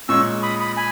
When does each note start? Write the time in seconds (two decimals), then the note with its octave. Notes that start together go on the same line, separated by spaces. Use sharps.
0.09 A#2 G#3 C#4 C#6 E6
0.43 B5 D#6
0.60 B5 D#6
0.77 G#5 B5